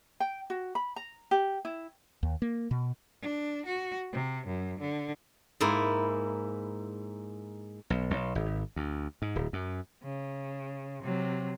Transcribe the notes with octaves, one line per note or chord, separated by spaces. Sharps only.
G5
F#4
B5
A#5
G4
E4
D#2
A#3
B2
D4
F#4
C3
F#2
D3
G#2 A#3 E4
B1
B1
G#1
D2
G#2
D1
F#2
C#3
C3 F#3